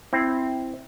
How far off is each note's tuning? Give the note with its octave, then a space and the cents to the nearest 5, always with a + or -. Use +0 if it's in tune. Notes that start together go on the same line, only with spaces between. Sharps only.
C4 +0 E4 +0